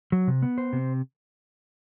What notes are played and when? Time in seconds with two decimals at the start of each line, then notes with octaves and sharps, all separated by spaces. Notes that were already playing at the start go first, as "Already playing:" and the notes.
0.12 F#3
0.28 C3
0.42 B3
0.58 C5
0.73 C3